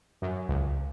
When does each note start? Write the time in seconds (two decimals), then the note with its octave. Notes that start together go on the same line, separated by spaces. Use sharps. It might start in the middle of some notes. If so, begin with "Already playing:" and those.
0.22 F#2
0.49 C#2